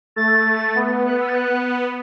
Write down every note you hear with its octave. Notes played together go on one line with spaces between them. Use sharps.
A3 A6
A3
B3
B3 F#6
E6
A6
F#6